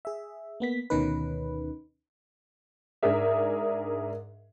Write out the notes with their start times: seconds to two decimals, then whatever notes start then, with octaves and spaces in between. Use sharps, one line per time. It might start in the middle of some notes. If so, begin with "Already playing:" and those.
0.05 G#4 E5
0.60 A#3 B3 B6
0.90 D2 B2 D#3 C#4 D#4 B4
3.03 G#2 D4 G#4 A#4 E5